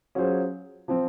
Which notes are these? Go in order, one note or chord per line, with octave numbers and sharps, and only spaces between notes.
F#3 C#4 F4 G#4 C5
F3 C4